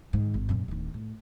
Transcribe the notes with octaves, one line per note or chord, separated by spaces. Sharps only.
G#2 D#3
G#1
F#2 A#2
D1 D#3
A2